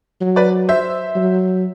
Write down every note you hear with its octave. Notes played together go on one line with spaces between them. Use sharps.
F#3
B4 D5
C5 E5
F#3